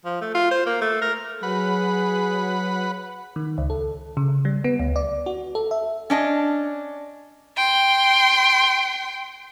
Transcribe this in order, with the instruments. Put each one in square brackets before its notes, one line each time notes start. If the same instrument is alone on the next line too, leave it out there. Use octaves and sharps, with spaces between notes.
[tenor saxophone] F3
A3
F4
C5
A#3
A3
A#4
[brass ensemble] F#3 [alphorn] G#4 [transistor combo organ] B4 F#5 B5
[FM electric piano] D#3
C#2
A4
C#3
G3
B3
D2
D5
F#4
A4
E5
[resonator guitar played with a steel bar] C#4 D4 D#5
[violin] G5 C6